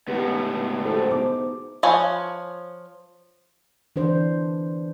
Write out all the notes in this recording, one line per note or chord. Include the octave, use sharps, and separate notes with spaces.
C#2 A2 B3 D#4 E4 G4
E4 F#4 A4 C5
B3 D#4 G#4 D6
F3 B4 C#5 G#5
E3 D4 C5